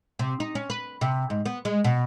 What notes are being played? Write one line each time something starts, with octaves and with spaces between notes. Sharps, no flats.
C3
D#4
C#4
B4
C3
G#2
B3
G#3
B2